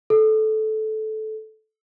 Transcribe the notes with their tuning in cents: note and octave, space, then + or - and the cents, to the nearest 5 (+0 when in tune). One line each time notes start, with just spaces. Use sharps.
A4 -15